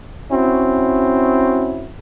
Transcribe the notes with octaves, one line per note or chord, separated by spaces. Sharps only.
C4 C#4 E4 F#4